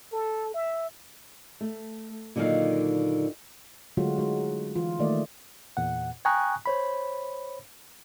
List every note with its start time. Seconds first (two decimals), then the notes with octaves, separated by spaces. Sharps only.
0.12 A4
0.54 E5
1.61 A3
2.36 A#2 D3 D#3 F#3 D#4 F5
3.97 D3 F#3 G#3 A3 F4 F#4
4.18 G#3 D#4 F#4
4.76 E3 F4
4.99 D#3 A3 A#3 D5 D#5
5.77 E2 A#2 F#5
6.25 G5 G#5 A#5 C#6 D#6 F#6
6.66 C5 C#5 B5